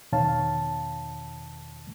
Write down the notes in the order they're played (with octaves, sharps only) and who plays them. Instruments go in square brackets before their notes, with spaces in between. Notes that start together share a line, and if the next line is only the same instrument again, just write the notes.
[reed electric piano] E2 B2 D#3 C#5 F5 A5